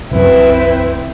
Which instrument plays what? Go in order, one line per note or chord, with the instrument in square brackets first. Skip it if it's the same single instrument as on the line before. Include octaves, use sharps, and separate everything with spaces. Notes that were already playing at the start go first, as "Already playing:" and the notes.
[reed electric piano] C2 F#2 [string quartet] C4 E4 B4